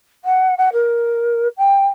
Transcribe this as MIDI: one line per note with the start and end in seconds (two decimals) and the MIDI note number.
0.25 0.55 78
0.58 0.69 78
0.73 1.48 70
1.58 1.88 79